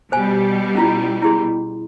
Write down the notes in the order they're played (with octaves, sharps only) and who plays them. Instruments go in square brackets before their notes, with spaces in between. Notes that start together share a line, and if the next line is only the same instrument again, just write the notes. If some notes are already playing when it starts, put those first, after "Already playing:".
[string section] B2 G3 [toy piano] C5 G#5
[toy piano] C#4 E4 F4
E4 G#4 C6